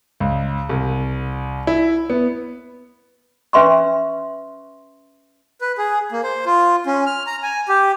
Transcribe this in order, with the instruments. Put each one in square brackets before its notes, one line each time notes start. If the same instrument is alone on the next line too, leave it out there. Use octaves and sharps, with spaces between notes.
[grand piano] C#2
C2
E4
B3
[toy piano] C#4 B4 E5 C6 C#6
[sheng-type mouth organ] B4
G#4
A#3
C5
F4
C#4
F6
A#5
G#5
G4